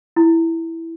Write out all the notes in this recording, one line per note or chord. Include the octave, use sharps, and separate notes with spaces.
E4